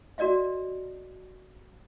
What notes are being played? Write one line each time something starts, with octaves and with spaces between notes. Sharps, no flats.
F#4 A#4 D5 D#5 F5